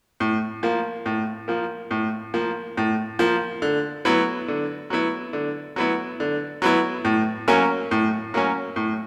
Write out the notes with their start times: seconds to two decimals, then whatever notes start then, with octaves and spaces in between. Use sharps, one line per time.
0.20 A2
0.63 F3 A#3
1.06 A2
1.48 F3 A#3
1.91 A2
2.34 F3 A#3
2.77 A2
3.19 F3 A#3
3.62 D3
4.05 F#3 B3 E4
4.48 D3
4.90 F#3 B3 E4
5.33 D3
5.76 F#3 B3 E4
6.20 D3
6.62 F#3 B3 E4
7.05 A2
7.48 F#3 A#3 C#4
7.91 A2
8.34 F#3 A#3 C#4
8.76 A2